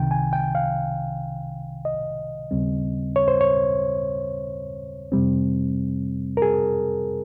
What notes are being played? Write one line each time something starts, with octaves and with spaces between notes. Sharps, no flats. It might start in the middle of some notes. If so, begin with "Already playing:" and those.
Already playing: C2 C3 D#3 G5
G#5
G5
F5
D#5
D#2 C#3 G3 C4
C#5
C5
C#5
F2 C3 G3 C4
A#4
G#4